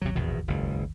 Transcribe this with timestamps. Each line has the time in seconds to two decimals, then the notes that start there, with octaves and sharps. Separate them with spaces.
0.02 G#1 D#2 C3 F#3
0.15 A#1 E2 B2
0.48 F#1 C#2